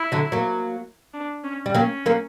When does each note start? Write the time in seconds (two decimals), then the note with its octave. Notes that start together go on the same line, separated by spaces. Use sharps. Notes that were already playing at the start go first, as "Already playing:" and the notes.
Already playing: E4
0.12 D3 F#3
0.32 F#3 A#3
1.14 D4
1.44 C#4
1.66 G3
1.75 F#3 A#3 C#4
2.06 F#3 A#3